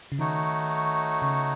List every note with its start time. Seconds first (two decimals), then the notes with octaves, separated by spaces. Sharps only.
0.12 C#3
0.19 D#3 A3 D#4 F#4 C#5
1.22 C#3